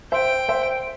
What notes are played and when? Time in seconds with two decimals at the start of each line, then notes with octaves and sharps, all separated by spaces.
0.12 C5 E5 G5
0.49 C5 E5